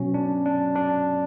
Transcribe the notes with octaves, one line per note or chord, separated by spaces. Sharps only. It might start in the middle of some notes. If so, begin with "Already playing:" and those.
Already playing: B2 F#3 C#4
D4
D4
D4